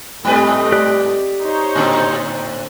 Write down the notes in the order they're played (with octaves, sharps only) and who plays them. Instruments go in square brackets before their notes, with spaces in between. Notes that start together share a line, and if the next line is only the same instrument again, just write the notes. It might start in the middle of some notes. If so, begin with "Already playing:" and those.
[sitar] G#2 G3 B4 [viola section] A3 C4 D#5
[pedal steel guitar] G4 D5 F#6
[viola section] D#4 C5 C#5
[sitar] A2 D3 C4